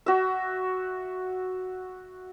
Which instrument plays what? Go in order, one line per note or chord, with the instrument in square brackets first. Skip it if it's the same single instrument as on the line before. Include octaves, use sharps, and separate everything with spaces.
[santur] F#4 E5